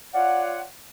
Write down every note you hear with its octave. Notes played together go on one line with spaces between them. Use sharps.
F4 C#5 D5 F5 F#5